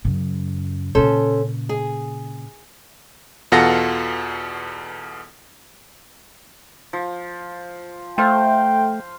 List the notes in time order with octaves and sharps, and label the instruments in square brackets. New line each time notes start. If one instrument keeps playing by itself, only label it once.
[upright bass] F#2 C#3
[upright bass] A#2 C#3 [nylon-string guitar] C#4 A4 C5
[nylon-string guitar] G#4
[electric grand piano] E2 B2 F4 A4 F#5 A#6
[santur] F3
[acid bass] A3 [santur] C5 F5 [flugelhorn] G5